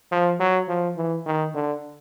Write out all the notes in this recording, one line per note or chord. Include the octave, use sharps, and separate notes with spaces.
F3
F#3
F3
E3
D#3
D3